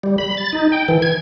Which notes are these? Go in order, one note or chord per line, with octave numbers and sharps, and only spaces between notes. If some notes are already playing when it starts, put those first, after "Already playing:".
G3
B5
A6
D#4
G5
E3
G#6